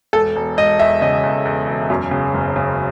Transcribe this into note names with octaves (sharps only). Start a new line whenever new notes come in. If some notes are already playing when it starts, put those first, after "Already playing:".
E1 A4
E1
E1 D#5
E2 E5
C#3 D#5
E2
E2
E1
F#2
C#3
F#1
C#3